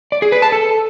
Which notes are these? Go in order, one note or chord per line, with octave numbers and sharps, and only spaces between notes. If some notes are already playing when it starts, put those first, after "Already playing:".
D5
G#4
B4
A5
A4